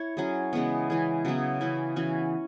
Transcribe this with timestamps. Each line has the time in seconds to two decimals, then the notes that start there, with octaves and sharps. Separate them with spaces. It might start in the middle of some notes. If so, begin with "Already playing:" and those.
Already playing: E4 C#5
0.17 F#3 C#4 G#4
0.53 C#3 E3 G#3 B3
0.90 E3 C#4 G#4
1.25 C#3 F#3 B3 E4
1.61 E3 C#4 E4
1.96 E3 C#4 F#4